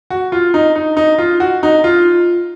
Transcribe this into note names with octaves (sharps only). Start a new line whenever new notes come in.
F#4
F4
D#4
D#4
D#4
F4
F#4
D#4
F4